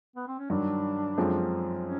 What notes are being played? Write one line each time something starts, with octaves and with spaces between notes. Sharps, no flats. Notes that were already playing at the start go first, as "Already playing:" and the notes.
B3
C4
C#4
G2 D#3 F#3 D4
F#2 D3 F3 G#3 C4
C#4